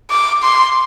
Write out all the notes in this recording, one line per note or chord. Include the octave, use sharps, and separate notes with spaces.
D6
C6